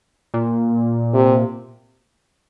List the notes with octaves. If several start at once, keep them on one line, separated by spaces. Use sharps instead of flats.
A#2
C3